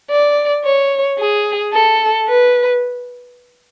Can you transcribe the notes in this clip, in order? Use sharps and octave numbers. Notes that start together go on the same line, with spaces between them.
D5
C#5
G#4
A4
B4